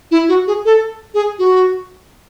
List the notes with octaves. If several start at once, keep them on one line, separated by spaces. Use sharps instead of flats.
E4
F#4
G#4
A4
G#4
F#4